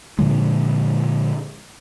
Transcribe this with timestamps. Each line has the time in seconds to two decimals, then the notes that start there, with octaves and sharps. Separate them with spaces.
0.19 A#2 D3 F3 G#3